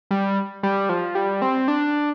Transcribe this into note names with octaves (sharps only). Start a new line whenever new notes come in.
G3
G3
F3
G3
C4
D4